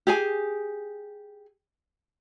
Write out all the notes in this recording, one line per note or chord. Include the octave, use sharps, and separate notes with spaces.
G4 G#4 G#5